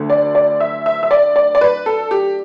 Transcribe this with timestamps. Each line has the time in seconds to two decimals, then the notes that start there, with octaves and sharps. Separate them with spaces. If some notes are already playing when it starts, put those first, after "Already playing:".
Already playing: D2 D3
0.10 D5
0.35 D5
0.60 E5
0.86 E5
1.03 E5
1.11 D5
1.36 D5
1.55 D5
1.61 B4
1.86 A4
2.11 G4